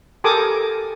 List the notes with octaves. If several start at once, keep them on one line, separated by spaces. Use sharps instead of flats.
G4 A4 A#4 G#5 D6 D#6